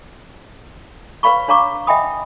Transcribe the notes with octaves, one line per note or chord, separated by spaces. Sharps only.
B4 C#5 F5 B5 C#6
D4 C#5 F5 A#5 C#6 D6
D#5 E5 G5 G#5 B5 D#6